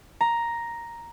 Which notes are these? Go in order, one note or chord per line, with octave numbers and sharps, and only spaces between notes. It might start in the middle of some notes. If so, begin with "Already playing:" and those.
A#5